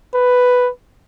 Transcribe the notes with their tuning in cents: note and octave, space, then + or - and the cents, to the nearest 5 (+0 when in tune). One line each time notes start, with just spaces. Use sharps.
B4 +5